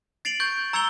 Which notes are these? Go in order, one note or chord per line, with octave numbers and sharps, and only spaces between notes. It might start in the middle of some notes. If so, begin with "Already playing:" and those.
A6 C7 D7 F7 F#7
C#6 G6 A6
A#5 E6 G#6 C#7 F7 G7